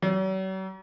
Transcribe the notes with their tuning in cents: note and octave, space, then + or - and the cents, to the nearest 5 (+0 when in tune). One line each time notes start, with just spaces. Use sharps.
F#3 +45